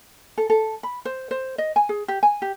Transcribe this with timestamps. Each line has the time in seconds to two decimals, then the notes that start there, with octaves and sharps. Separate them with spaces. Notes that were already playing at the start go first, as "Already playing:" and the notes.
0.38 A4
0.50 A4
0.83 B5
1.05 C5
1.31 C5
1.58 D#5
1.76 G#5
1.89 G#4
2.08 G4
2.23 G#5
2.42 G4